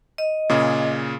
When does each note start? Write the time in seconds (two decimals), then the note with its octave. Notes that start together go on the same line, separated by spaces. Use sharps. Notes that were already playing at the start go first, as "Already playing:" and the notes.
0.18 D#5
0.49 A#2 C#3 G#4